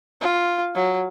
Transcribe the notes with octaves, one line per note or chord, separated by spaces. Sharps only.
F4
F#3